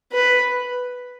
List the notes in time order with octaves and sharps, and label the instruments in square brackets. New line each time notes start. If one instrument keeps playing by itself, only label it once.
[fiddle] B4